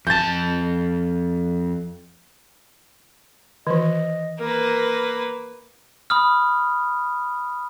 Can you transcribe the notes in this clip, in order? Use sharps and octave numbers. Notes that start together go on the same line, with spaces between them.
F2 A5 G6 A6
D#3 E3 D#5
A#3 A#4 B4
B5 D#6 F6